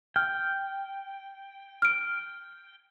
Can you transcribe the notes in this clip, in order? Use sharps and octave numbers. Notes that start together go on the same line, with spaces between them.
G5 F6
F6 D7